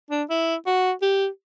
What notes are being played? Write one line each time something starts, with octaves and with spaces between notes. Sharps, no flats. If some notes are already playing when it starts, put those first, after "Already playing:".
D4
E4
F#4
G4